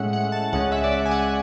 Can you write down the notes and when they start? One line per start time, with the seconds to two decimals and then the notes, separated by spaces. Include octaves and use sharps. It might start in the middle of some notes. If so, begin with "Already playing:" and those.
Already playing: A2 G#3 C#4 E5 F#5
0.13 F#5
0.32 A5
0.53 C#2 C#3 G#3 C#4 F#5
0.72 E5
0.84 D5
0.91 E5
1.06 G#5
1.11 F#5